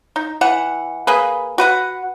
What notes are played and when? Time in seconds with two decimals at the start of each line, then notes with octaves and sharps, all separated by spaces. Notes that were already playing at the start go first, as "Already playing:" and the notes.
0.16 D#4
0.41 E3 F#5
1.07 A#3 G#4 B4
1.58 F#4 B4 F#5